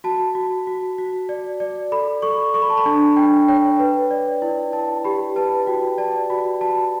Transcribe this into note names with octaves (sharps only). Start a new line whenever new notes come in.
F#4 A5
F#4
F#4
F#4
D5
D5
A4 B5
A4 C#6
A4 C#6
B5
A5
B5
D4
D4 G5
C#5 G5
B4
D5
E4
E4 A5
G4 B5
B4 A5
F#4 G5
D5 A5
F#4 B5
F#4 A5